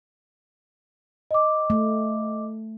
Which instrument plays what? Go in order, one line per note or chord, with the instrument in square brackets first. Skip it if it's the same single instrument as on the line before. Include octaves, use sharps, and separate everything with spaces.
[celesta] D#5 D6
[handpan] A3